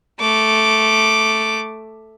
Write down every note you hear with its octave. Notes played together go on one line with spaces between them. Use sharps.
A3 D6